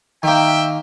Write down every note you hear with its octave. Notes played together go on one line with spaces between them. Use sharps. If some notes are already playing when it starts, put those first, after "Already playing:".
D#3 A#3 E5 G5